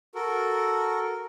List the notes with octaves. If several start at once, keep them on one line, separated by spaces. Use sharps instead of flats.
F#4 A4 A#4